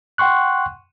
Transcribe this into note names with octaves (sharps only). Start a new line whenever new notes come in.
F#5 G5 C6 C#6 F#6